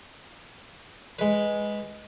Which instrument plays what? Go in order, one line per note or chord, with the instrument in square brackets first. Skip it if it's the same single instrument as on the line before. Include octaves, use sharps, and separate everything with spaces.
[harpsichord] G#3 B4